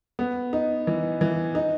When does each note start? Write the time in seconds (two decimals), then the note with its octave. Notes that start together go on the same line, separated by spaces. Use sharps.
0.19 B3
0.53 D#4
0.87 E3
1.21 E3
1.55 D#4